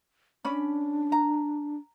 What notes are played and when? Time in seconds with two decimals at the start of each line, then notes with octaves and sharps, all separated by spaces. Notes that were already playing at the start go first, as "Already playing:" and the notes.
0.45 C#4 D4 D5 B5
1.12 A#5